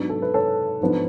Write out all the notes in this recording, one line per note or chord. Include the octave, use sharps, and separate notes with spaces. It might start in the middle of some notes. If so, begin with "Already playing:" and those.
Already playing: G#2 F#3 B3 D4
A4
B4
A4 C#5
G#2 F3 B3 D4